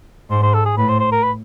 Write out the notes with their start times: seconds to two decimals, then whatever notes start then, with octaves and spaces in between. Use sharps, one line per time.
0.30 G#2 C5
0.43 C5
0.54 A4
0.66 G#4
0.77 A2 B4
0.88 C5
1.00 C5
1.12 A#4
1.23 B4